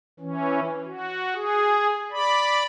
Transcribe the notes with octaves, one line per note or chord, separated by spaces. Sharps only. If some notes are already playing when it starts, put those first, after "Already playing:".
E3 C#4
F#4
G#4
D5 B5